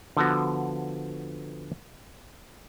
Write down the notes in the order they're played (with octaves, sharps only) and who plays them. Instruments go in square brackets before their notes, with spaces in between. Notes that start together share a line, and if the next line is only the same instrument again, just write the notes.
[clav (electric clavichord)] D3 F3 B3 F#4